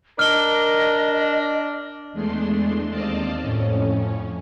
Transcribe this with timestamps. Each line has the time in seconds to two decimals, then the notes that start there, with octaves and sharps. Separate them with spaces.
0.19 D4 A#4 D#5 F6 G7
2.12 E2 G#3 A3 D4 C6
2.90 D#2 C4 D5 D#5 F5 A5
3.41 F2 A2 C#4